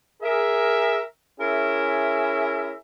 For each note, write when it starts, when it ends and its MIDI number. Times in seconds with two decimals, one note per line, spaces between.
0.22 1.01 68
0.22 1.01 70
0.22 1.01 76
1.40 2.74 61
1.40 2.74 64
1.40 2.74 68
1.40 2.74 70
1.40 2.74 76